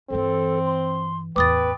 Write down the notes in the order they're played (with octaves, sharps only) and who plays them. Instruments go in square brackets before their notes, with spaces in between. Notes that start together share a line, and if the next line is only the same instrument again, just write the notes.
[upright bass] G2 E3 [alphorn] C4 [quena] A4
[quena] C6
[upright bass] A1 E2 [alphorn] B4 [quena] G5 [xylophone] D6 D#6 A6